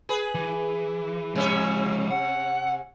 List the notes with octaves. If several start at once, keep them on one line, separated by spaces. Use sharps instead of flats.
G#4 B4
E3
C3 F3 G#3 C#4 E5
F#5